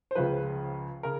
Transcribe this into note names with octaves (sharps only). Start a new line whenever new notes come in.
C5
C#2 C#3 F3 B4
C#3 A#4